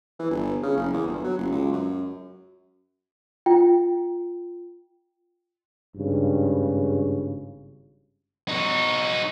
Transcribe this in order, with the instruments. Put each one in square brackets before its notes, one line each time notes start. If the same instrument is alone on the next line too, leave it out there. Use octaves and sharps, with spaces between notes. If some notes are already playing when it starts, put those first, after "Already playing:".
[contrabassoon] E3
G1
C#3
F#1
E2
G1
F#3
F#1
C#2
F#2
[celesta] F4 G5
[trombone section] G#1 G2 C#3
[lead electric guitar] D#4 F#4